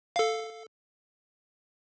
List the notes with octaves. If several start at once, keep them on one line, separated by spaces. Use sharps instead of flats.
A4 F5